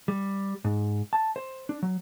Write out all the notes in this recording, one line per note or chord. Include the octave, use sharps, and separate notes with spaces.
G3
G#2
A5
C5
D4
F#3